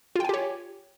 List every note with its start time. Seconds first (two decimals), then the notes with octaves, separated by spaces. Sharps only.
0.16 F4
0.20 G5
0.25 G#5
0.29 G4
0.34 C#5